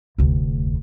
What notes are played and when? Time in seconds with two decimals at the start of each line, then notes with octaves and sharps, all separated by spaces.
0.18 F1 D2